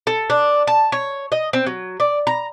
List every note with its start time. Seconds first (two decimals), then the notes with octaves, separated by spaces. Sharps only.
0.07 A4
0.30 D4
0.67 A5
0.92 C#5
1.32 D#5
1.53 C4
1.66 F#3
2.00 D5
2.27 A#5